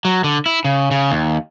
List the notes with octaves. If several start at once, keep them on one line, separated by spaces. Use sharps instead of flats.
F#3
D3
E4
C#3
C#3
D#2